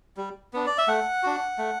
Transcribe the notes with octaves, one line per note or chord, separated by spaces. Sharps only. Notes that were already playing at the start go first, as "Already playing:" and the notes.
G3
B3 D4
D5
E5
A3 F#5
D4 F#4
A3